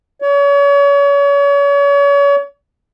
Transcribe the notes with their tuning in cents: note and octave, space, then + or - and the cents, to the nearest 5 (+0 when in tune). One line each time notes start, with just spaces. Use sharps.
C#5 +35